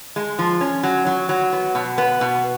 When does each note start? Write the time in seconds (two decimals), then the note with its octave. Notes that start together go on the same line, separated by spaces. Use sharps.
0.16 G#3
0.39 F3
0.61 C#4
0.83 F#3
1.06 F#3
1.29 F#3
1.53 B3
1.75 B2
1.98 B3
2.21 B2